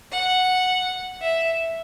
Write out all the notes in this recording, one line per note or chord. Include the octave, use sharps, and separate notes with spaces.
F#5
E5